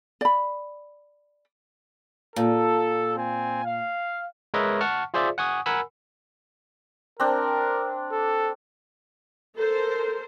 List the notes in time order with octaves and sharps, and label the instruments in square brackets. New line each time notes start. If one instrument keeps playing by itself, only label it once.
[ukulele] D5 B5
[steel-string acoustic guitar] A#2 [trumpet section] A4
[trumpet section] C4 G#5
F5
[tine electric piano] G#3 A#4 B4 C#5 D#5 E5
F#5 A5 C#6 F6
F4 G#4 C5 D5 E5
F#5 G#5 C#6 D#6
A#4 F#5 G#5 B5 E6
[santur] C4 D4 [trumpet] A#4
[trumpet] A4
[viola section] A4 A#4 C5